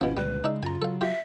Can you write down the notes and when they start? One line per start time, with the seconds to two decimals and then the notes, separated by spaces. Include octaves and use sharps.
0.01 G#1 B2 F3 C#4 E4
0.17 C#2 A#2 D3 G3 G#3 B4
0.44 C#3 G#3 D4 D#4 E5
0.63 F#2 F4 G#5 A#5
0.82 F#3 A4 F5
1.01 F4 G4 E5